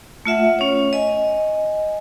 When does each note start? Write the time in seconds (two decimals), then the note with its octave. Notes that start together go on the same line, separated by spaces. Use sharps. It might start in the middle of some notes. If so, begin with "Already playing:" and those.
0.26 A3 F4 E5 F#5
0.59 C#4 C#5
0.93 D#5 G#5